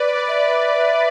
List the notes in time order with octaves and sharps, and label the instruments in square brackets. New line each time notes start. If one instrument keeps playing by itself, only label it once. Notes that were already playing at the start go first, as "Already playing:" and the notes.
Already playing: [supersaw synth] B4 D5
[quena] E5